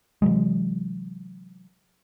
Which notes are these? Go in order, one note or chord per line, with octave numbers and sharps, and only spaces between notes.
C3 E3 F#3 G#3